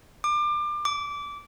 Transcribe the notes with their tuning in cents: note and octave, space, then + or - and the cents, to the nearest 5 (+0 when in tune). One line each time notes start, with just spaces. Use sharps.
D6 +30
D6 -20